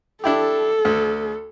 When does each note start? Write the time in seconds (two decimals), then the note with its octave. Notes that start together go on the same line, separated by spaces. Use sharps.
0.24 D4 E4 G4 A4
0.85 D2